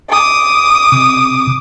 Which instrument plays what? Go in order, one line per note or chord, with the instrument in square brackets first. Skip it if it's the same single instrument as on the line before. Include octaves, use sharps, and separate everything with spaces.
[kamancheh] D6 D#6
[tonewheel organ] C3